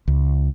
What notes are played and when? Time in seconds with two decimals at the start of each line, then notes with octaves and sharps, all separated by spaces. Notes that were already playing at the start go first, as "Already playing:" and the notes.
0.08 C#2